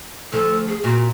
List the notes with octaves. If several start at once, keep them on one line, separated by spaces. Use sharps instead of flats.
D2 F3 A4
G#4
A#2 F#4